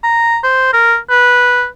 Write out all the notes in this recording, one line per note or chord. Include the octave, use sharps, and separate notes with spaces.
A#5
C5
A#4
B4